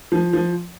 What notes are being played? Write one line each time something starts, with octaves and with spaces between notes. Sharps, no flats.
F3
F3